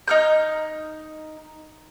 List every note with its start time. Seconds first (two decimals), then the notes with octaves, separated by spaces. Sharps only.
0.08 D#4 F6 G6